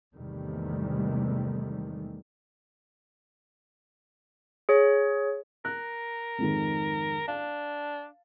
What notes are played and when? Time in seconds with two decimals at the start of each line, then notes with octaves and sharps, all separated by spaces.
0.15 E2 G#2 C3 D#3 G3 A3
4.69 G#4 C#5
5.65 A#4 F#6
6.38 F2 G#2 D#3
7.28 D4 F5 A5